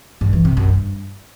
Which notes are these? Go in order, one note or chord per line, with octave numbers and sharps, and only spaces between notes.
G2
E3
C3
F#2
G2